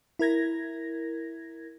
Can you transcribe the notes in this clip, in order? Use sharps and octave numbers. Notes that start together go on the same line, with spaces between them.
E4 A#4 G#6 A#6